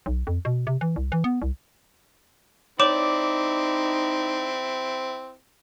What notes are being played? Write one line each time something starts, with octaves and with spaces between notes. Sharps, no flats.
B1
F2
B2
C3
E3
C2
E3
B3
C2
C4 D#4 E4 C#5 D5 D6 E7